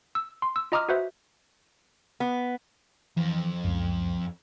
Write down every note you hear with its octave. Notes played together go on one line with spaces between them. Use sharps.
E6
C6
E6
F4 D#5 A#5 D6 D#6 F6
F#4 B4 C5 E5
B3
F2 E3
C#2 F#2